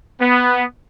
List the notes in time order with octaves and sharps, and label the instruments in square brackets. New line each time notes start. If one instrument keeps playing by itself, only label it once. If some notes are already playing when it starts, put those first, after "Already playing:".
[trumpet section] B3